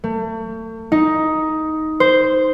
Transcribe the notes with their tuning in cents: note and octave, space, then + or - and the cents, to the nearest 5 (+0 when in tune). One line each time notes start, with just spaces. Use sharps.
A3 +35
D#4 +10
C5 -5